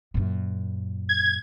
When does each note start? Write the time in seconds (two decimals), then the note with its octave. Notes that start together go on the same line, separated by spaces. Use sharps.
0.14 F#2 A#2
1.09 G#6